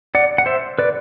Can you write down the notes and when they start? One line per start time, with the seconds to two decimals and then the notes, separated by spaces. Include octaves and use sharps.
0.15 D5 F#5
0.38 F#5
0.46 C5 E5
0.79 B4 D5